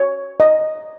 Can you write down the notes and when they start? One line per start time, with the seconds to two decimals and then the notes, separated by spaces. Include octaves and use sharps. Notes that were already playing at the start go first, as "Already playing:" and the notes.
Already playing: C#5
0.40 D#5